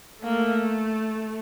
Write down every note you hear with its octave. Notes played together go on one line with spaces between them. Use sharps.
A3 A#3